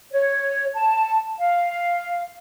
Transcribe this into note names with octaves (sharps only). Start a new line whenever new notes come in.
C#5
A5
F5